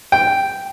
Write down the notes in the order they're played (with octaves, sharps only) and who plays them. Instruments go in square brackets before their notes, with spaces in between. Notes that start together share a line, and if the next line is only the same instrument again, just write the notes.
[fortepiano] G5